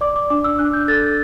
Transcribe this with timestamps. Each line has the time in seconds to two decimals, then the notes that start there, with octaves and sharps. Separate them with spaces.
0.01 D5 D6
0.16 D6
0.30 D4 D6
0.44 E6
0.59 D4 F#6
0.73 G6
0.88 A4 A6
1.03 A6